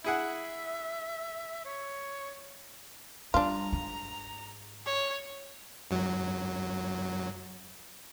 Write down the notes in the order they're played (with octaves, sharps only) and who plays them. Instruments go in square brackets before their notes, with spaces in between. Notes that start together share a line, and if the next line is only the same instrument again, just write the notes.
[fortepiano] E4 G#4 F#5 [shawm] E5
[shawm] C#5
[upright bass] G3 [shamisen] D4 F4 [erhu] A#5
[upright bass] G#2
[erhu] C#5
[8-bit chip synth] F#2 F#3